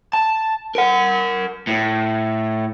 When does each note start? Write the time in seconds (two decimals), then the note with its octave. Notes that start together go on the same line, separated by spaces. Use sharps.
0.13 A5
0.75 A#4 F#5
1.67 A2